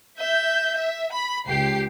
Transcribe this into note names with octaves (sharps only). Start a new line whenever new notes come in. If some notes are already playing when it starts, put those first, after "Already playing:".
E5 G6
E5
B5
C#2 G4 C7